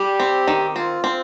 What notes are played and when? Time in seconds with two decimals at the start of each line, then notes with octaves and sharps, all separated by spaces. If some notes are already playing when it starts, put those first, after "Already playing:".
Already playing: G3 G4
0.20 C4
0.47 D#3
0.76 C4 F4
1.04 C4